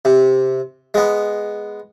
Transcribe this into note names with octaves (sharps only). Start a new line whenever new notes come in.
C3
G#3 B3